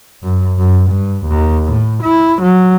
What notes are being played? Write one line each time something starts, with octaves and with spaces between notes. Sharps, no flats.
F#2
F#2
G2
D#2
A2
E4
F#3